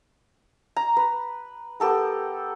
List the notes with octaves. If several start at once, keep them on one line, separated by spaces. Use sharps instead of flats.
A#5
B4
B3 G4 A4 A#4